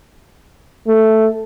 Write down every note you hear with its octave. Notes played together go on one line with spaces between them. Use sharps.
A3